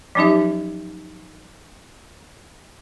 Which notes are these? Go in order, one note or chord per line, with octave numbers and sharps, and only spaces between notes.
F3 F#3 C#4 D#4 G4 E5